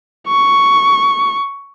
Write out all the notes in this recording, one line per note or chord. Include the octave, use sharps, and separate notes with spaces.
C#6